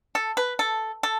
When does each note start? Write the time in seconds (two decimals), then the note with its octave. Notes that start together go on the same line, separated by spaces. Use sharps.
0.15 A4
0.37 B4
0.59 A4
1.03 A4